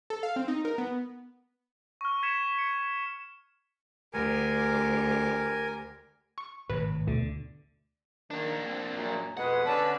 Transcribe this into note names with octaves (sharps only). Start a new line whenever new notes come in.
A4
F5
C4
D#4
A#4
B3
C#6 F6
G#6 B6 C#7 E7
C#7
D2 G4 A#4 G#5
C#6
G#1 A2 C3 B4 C#5
D2 B2 D3 A3
D#3 A#3 D4
C4
F#2 A#2
F2 B2 G#3 B4 F#5
D3 C#4 B4 D5 A5